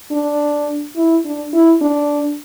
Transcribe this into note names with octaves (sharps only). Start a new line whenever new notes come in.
D4
E4
D4
E4
D4